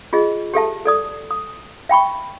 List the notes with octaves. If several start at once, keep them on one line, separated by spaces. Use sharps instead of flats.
F4 G#4 D#5
G4 A4 E5 A5
A4 D5 D#6
D#6
E5 G5 B5 C#6